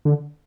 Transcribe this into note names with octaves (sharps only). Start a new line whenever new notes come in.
D3